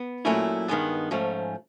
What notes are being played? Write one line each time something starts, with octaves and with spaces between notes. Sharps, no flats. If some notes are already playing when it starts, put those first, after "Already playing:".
Already playing: B3
A#2 F#3 A3 C#4 E4
G2 D#3 G#3 B3
G#2 F3 A3 C#4